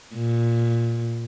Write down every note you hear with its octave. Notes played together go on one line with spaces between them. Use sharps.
A#2